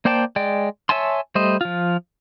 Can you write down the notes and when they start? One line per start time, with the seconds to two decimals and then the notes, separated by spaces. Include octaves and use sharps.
0.05 A#3 C5 D5 G5 A5
0.36 G#3 D5 G5
0.89 C#5 E5 G#5 A5 C6
1.35 G3 A3 C5 D#5
1.61 F3 F4